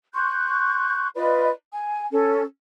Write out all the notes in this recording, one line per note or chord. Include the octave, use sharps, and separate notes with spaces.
C6 C#6 F#6 G6
F4 B4 D5 D#5
G#5
C#4 A4